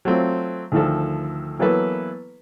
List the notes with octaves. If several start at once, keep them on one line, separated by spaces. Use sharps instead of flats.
F#3 A3 C4 F4
D2 D#3 F3 A4
E3 F#3 A#3 B3 A4 B4